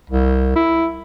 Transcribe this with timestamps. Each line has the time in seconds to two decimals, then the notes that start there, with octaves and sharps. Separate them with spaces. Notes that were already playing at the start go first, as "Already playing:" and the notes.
0.10 C2
0.56 E4